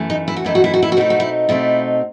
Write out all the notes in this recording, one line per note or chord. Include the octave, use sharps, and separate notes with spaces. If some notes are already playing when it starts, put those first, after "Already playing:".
Already playing: F#2 E3 A3
D#4
E4
F#4
F#2 E3 A3 D#4 E4
F#4
E4
F#4
E4
F#4
B2 A3 C4 D#4 E4
F#4
E4
B2 A3 C4 D#4 E4